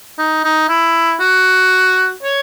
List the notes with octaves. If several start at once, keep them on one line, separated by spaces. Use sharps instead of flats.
D#4
D#4
E4
F#4
C#5